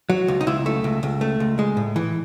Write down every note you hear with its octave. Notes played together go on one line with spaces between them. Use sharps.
F#3
C#2
D#4
C#2 E4
A3
C#2
C#2
A3
C#2
G#3
A2
E3